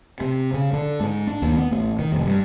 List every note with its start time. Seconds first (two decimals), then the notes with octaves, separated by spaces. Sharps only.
0.21 C3
0.54 C#3
0.73 D3
1.00 G#2
1.27 D4
1.42 D#2
1.57 B3
1.71 A1
1.99 D#3
2.12 F1
2.26 G2